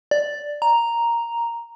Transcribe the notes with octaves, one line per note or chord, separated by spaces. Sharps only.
D5
A#5